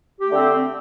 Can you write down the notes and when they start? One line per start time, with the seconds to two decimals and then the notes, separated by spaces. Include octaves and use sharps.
0.20 G4
0.25 A3
0.29 D3
0.34 C4